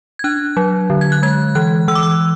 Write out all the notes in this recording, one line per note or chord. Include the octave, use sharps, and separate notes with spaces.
G#6
D4 F#6
F#3
D3
G#6
F#6
G#3 G#6
E3 F#6
E3 E6
D6
E6